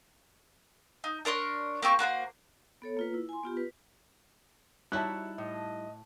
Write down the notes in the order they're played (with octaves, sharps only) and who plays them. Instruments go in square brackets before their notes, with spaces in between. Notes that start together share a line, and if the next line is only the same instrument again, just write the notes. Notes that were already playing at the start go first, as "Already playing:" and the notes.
[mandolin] D#4
D4 A#4 C#5 C6
A#3 C4 G4 C#6
A#3 F#4 B4 C5
[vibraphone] B3 A4 C#5
A#3 F4 B4
E4
G#5 C6
B3 F4 G4
B4
[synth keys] G3 D#4 E4 [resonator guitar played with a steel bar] F#4 C#5 E5 [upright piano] A5 F#6
[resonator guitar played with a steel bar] A2 [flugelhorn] D#5